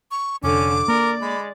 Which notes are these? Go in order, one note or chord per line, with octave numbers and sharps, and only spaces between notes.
C#6
F1 D3 C#4 D6
A#3 A#4 D5
G#3 B5